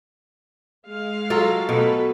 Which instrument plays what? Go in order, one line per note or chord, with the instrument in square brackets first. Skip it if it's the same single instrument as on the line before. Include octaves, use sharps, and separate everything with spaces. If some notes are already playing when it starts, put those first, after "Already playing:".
[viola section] G#3 F5
[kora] F#3 F4 A4
[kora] B2 [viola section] A3 A4 B4